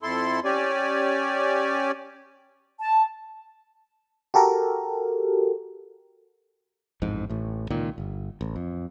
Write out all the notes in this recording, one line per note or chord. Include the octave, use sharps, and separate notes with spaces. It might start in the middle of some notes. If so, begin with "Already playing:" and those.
F2 E4 A4 C6
C#4 G4 D5 G#5
A5
F#4 G4 A4 A#4
A1 F2 G#2
A1 A2
C#2 A#2 D#3
G1
A1
F2